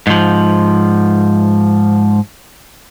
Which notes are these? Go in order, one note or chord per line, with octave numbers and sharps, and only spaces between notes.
G#2 F3